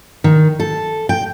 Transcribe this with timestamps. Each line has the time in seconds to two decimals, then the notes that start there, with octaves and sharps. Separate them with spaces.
0.24 D#3
0.60 A4
1.09 G5